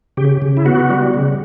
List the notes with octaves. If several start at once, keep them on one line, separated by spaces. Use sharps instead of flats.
C#3 G4
C#3
E4
B3 F#4
G3
C#3